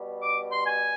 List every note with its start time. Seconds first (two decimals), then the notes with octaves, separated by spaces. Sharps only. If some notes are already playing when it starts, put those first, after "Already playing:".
Already playing: B2 G3
0.22 D6
0.50 C6
0.63 G#5